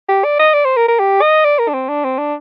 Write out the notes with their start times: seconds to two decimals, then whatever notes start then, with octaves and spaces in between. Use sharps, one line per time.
0.09 G4
0.24 D5
0.39 D#5
0.54 D5
0.65 C5
0.76 A#4
0.88 A#4
1.00 G4
1.22 D#5
1.45 D5
1.59 A#4
1.68 D4
1.74 C4
1.89 D4
2.05 C4
2.19 D4